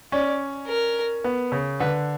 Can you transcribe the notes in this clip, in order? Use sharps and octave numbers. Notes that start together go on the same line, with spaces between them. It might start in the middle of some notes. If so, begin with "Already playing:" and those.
C#4 D5
A#4
B3
C#3
D3 B4